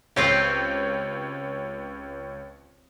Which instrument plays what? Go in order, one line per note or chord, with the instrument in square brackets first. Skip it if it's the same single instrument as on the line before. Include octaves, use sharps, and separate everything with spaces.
[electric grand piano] C#2 C#5 [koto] C4 F4 G4